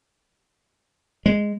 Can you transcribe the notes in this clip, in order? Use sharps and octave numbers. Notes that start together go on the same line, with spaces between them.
G#3